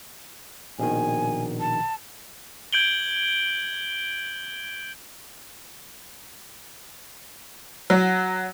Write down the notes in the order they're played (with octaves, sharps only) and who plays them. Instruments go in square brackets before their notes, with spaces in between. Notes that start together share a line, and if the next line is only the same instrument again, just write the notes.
[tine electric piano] A#1 B2 D#3 [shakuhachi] G#5
[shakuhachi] A5
[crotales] G6 G#6 D7 F#7 G7
[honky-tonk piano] F#3